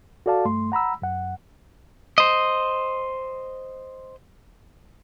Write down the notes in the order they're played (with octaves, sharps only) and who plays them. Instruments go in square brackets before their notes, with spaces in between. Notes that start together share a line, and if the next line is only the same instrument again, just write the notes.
[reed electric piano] F#4 A4 D5 F5 A5
G2 A3 C6
F#5 A#5 B5 E6
F#2 F#5
[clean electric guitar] C5 D#5